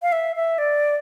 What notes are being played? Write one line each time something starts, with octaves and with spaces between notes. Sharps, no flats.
F5
E5
E5
D5